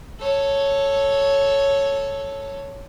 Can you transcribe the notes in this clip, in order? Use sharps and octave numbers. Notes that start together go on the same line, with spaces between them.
A4 C#5